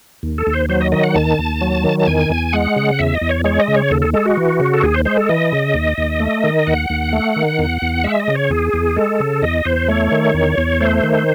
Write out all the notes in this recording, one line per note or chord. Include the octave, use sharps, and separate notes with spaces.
D#2
A4
D#2
C5
F#3 C5
D#5
D#3 D#5
F#5
D#2 A5
D#2
F#3
D#3
A5
E2 G#5
E2
G#3 F#5
C#3
E2 E5
D#5
E2
C#5
G#3 C#5
D#5
C#3
C#5
D#2 A4
A4
G#3 A4
F#4
E3
C#3
A4
D#2 G#4
C5
G#3 C5
A4
E3 D#5
C#3
D#2
D#2
A3
D#3
D#2 F#5
D#2
A3
D#3
E2
E2
G#3 E5
D#5
C#3
C#5
E2 G#4
E2
G#3 A4
C#3
E2 D#5
E2 C5
A3 C#5
D#3
E2
E2
A3 C5
D#3